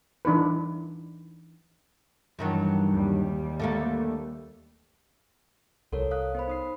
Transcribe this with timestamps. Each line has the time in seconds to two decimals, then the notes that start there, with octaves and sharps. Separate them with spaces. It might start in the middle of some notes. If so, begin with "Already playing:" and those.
0.25 E3 D4 D#4 B4
2.39 G2 D#3 E3 F#3
2.89 D#2 G3
3.60 D3 A3 A#3
5.93 C2 A4 A#4 C#5
6.11 F5 D#6 F#6
6.35 B3 C5 B5
6.48 D#4 D#6 C7